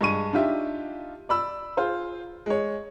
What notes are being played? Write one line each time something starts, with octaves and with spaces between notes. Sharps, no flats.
G2 G#3 G#4 C#6 D#7
D4 D#4 F4 G4 E5
D5 B5 E6
F4 G#4 C5
G#3 C#5